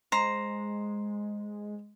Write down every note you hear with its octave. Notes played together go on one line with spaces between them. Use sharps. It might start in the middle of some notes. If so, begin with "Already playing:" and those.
G#3 C5 A#5